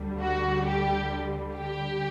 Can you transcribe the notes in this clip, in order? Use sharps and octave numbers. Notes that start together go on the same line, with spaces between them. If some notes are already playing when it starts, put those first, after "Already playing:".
Already playing: D2 D3 G3
F#4
G4
G4